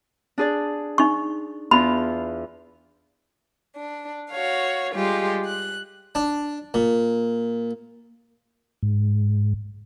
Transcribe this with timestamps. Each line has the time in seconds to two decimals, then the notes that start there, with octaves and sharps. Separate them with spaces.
0.38 D4 G#4 D5
0.98 D#4 C#6
1.71 E2 D4 F4 B5
3.74 D4
4.31 F#4 C#5 F5
4.93 G3 G#3 F4 G4
5.45 F#6
6.15 D4
6.74 A#2
8.83 G#2